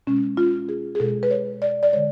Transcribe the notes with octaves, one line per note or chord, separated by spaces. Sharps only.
B2 G#3 C#4
F4
G#4
G#4
B2 G#3 A4
B4
C#5
D5
D5
D3 G#3 C#5